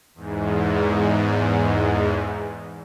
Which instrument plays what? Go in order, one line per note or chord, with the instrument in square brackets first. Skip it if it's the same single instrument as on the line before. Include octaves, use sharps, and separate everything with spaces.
[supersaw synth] E2 G#2